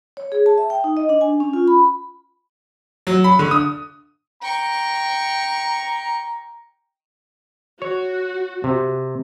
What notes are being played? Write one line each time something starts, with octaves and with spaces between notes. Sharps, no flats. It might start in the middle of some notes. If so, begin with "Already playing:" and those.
C#5
G#4
A5
E5
G5
D#4
D#5
D4
G#5
C#4
F4
B5
F#3
B5
D3
D#6
G5 A#5 C#6
F#4 C#5
C3